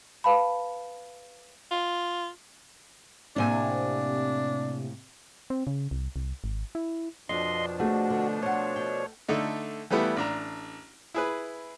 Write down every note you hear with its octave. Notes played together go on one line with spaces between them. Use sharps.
B4 F5 A5 B5
F4
A2 C3 A#3 D4 G#5
C4
C#3
C2
C2
G#1
E4
F2 B2 F3 D4 D#5 C6
A3 F#4 G#4
D3
C5 C#5 F#5
G5
D3 A3 D#4
E3 G3 A3 B3 E4
A1 D4 A#5
E4 G#4 B4